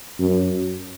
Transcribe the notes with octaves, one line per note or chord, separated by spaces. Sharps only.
F#2